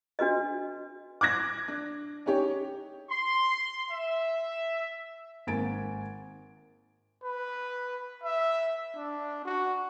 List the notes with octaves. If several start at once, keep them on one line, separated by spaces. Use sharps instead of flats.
D4 F#4 B4 D#5
D6 F#6 G#6 A#6
D4
C#4 D#4 G4 C#5
C6
E5
G#1 A#3 G#5 G#6 A6 D7
B4
E5
D4
F#4